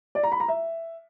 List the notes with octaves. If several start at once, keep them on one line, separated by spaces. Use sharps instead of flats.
D5
A#5
B5
A#5
E5